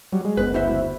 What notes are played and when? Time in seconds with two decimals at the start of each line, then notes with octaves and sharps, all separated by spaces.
0.13 F#3 G3
0.25 G#3
0.37 F#1 D2 B3 B4
0.54 E4 F#4 C5 E5